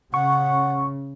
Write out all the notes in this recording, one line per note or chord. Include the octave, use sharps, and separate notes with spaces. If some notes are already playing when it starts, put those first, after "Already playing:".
C#3 F#5 C#6